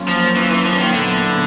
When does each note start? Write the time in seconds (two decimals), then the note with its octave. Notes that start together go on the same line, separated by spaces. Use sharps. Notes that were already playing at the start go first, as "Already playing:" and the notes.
Already playing: F#3 A#3 C#4 F4
0.08 F3
0.37 E3
0.51 E3
0.65 F3
0.79 D#3
0.93 A#2 D3 F#3 B3 E4